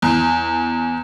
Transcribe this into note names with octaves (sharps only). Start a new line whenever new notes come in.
E2